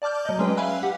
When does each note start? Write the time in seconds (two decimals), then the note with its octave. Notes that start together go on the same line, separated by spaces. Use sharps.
0.02 D5 A5 D6 F6 G6
0.25 F#3 D#5
0.39 G#3 C#4 G#4 B4 D#5 G5
0.57 E5 F5 G#5 B5 E6 F#6
0.82 G4 F#5